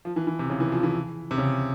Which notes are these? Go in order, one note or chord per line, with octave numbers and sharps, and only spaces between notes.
F3
E3
E3
C3
C#3
E3
F3
E3
C3
C#3